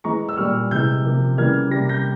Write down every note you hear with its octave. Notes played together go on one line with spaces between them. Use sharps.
E3 G#3 A#5 C#6
E6
A#2 G3 A#3 C#6 F6
C3 E3 G#3 E6 G6
C3 F3 A#3
C#3 E3 G3 A#3 F6 G#6
C3 G3 A#3 A#6
G6 A#6